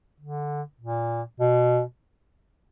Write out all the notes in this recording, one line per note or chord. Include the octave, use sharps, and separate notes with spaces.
D3
A#2
B2